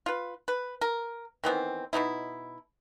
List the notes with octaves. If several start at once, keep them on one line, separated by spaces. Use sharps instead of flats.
F4 B4
B4
A#4
D#3 E3 B3 C4
B2 F3 D#4 E4